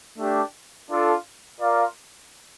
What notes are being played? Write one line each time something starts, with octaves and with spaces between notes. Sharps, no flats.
A3 D4 G4
D4 F4 A4
F4 A#4 D5 F5